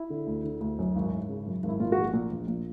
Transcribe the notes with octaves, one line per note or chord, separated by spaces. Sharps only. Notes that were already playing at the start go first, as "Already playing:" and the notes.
Already playing: E4
D3
D2
D3
D2
F#2
G#1
G#1
C#3
F#2
G#1
E4
A#2 F4
F#4
A#1
A#2
A#1
A#2